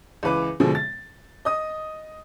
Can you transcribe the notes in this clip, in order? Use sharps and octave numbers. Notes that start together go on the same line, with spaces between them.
C#2 E3 B4 D6
B2 D3 F3 G#3
A6
D#5 D#6